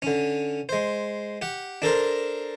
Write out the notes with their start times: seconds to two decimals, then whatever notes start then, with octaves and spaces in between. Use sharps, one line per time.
0.02 D3 C#4
0.69 G#3 C5
1.42 G4 F#5
1.82 D4 A4 A#4 C5